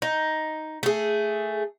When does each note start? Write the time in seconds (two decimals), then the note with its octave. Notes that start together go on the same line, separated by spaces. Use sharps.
0.02 D#4
0.83 A3 G#4